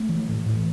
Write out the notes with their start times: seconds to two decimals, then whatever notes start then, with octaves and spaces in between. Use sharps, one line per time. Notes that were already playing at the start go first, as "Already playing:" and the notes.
Already playing: A3
0.09 E3
0.28 A2
0.46 A2